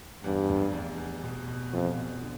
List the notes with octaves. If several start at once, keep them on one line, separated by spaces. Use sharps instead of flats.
E2 G2
F1
E2
E2
B2
B2
F2 B2
B2
D3